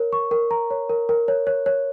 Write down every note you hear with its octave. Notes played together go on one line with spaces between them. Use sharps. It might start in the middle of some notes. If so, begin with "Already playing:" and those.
Already playing: A#4 C#5
C#6
A#4
A#5
C#5
A#4
A#4
C#5
C#5
C#5